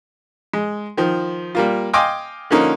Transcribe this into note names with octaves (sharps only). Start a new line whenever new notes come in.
G#3
D#3 F3
G3 A#3 F4
D#5 F5 G5 G#5 C6 D6
D3 F3 A#3 C#4 D#4